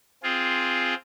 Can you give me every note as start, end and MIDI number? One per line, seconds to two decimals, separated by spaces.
0.23 0.95 60
0.23 0.95 65
0.23 0.95 68